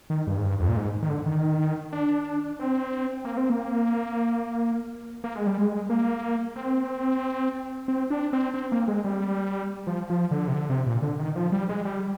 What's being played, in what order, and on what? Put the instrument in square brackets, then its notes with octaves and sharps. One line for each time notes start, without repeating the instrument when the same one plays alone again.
[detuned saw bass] D#3
G2
G#2
G2
F2
A#2
G#2
D#3
D3
D#3
D4
C4
A#3
C4
A#3
A#3
G#3
G3
G#3
A#3
C4
C4
D4
C4
C4
A#3
G#3
G3
F3
F3
D3
C3
D3
C3
A#2
D3
D#3
F3
G3
G#3
G3